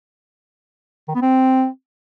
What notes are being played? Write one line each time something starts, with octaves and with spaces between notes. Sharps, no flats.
D#3
B3
C4